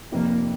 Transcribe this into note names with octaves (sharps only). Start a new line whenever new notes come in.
F1 F2 C3 A#3